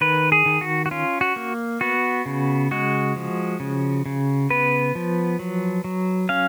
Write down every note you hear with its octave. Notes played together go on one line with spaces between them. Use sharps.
D#3 B4
G#4
D#3
F#4
F#4
C#4 F4
F#4
A#3
B3 F#4
C#3
G#3 F#4
F3
C#3
C#3
B3 B4
F3
F#3
F#3
C#4 F5